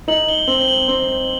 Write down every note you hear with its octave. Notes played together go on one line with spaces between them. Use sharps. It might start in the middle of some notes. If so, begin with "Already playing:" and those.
D#4 F#7
G7
C4 F#7
G7
F#7
C4